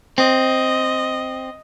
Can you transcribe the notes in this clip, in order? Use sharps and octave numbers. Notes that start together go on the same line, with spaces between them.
C4 D#5